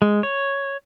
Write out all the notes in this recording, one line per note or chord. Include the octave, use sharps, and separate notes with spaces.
G#3
C#5